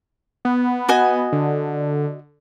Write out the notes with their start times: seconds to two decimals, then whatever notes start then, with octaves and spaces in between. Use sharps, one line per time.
0.45 B3
0.89 F#4 D#5 G#5
1.32 D3